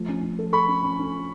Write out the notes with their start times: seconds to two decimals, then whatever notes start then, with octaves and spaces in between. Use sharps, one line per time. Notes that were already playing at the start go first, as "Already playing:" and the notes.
Already playing: F3 A3
0.08 C#4
0.23 C#4
0.39 A4
0.53 A4 B5 C#6
0.68 C#4
0.83 C#4
0.99 C#4